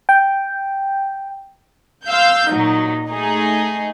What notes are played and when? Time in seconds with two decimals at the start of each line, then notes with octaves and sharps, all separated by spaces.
0.09 G5
2.06 F5 C6 E6 G6
2.48 A#2 F#3 D#4
3.08 A3 D#4 G#4